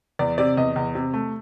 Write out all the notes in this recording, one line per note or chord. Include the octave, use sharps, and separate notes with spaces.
E2 D5
C3 D5
E2 D#5
E2
C3
A3